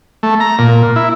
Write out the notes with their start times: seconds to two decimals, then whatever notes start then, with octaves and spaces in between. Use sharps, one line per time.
0.23 A3
0.40 A#5
0.59 A#2
0.96 E4